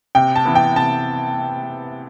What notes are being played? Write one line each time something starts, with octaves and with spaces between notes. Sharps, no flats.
C3 G5
A5
E3 B3
G5
C3 A5